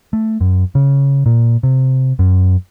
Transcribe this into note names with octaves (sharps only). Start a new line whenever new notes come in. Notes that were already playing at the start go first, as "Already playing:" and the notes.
A3
F#2
C#3
A#2
C3
F#2